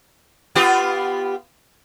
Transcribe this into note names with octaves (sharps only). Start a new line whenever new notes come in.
B3 F4 G4